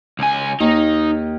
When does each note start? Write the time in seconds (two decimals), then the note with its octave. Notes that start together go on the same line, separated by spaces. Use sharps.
0.19 C#2 G#5
0.60 D#2 D#4